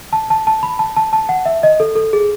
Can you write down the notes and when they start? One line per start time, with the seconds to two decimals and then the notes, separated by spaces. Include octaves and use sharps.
0.13 A5
0.30 A5
0.47 A5
0.63 B5
0.79 A5
0.96 A5
1.13 A5
1.29 F#5
1.45 E5
1.63 D#5
1.80 A4
1.95 A4
2.13 G#4